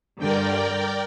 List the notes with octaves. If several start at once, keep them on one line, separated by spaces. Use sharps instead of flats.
G2 D3 A#4 D5 G5